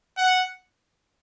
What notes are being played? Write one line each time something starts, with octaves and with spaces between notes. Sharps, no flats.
F#5